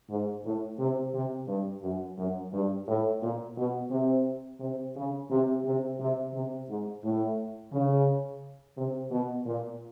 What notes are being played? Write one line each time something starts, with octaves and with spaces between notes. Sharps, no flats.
G#2
A2
C3
C3
G2
F#2
F#2
G2
A2
A#2
B2
C3
C3
C#3
C3
C3
C3
C3
G#2
A2
C#3
C3
B2
A#2